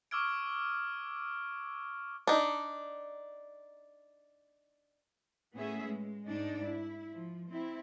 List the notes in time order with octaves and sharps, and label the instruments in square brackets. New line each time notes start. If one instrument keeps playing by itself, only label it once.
[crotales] C#6 D6 E6 F6 G#6 D7
[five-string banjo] D4 D#4
[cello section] A2 A3 B3 C#4 G#4 E5
G#3
G#2 D4 D#4
E4
F3
C4 E4